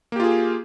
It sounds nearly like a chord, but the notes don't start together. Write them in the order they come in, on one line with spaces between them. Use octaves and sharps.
A#3 G4 F4 G#4